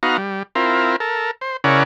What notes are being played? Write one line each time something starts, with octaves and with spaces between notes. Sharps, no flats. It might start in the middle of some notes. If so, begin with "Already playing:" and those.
B3 D#4 F#4 F5 A#5
G3
C4 E4 F4 A#4
A4 A#4
C5
C#3 C#4 E4 A#4 D5 F#5